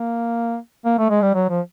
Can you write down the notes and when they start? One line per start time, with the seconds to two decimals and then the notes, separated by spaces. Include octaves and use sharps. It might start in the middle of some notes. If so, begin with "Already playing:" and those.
Already playing: A#3
0.85 A#3
0.98 A3
1.10 G#3
1.22 G3
1.34 F#3
1.49 F3